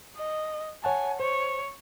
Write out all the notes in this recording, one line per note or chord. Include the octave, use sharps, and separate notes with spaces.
D#5
C#5 F#5 G#5 A5
C5 C#5